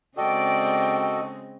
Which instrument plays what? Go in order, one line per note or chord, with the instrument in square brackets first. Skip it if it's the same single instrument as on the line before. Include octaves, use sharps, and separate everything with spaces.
[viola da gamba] C#3 G#3 C4 [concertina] F#4 A4 D#5 [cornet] D5 [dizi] G5